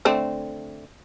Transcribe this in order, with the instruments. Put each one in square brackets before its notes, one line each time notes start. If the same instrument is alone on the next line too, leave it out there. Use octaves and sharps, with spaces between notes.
[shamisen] D3 A3 C4